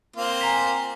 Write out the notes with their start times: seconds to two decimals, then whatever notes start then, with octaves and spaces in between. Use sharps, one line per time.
0.16 A#3 C4 F4
0.41 G#5 A#5 B6